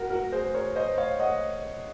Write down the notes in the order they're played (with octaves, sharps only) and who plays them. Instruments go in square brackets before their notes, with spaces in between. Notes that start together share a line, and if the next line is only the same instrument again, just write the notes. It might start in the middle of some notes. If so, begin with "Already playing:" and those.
Already playing: [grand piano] F#4 A#4
F#4 A#4
G#4 C5
A#4 C#5
C5 D#5
C#5 F5
D#5 F#5